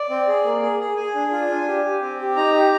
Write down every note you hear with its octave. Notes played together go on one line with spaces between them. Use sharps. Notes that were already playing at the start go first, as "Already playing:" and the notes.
Already playing: D5
C4
G#4
A#3
G#4
G#4
G#4 G#5
D4
F4
D4
G4
G4
C4
G4
D#4 A#5
G4